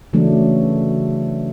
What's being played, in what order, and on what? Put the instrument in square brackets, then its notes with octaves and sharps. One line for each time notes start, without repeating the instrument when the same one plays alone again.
[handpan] C#3 E3 F#3 A3 D4